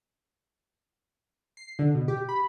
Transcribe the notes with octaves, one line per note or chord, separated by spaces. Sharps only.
C7
D3
B2
G4
B5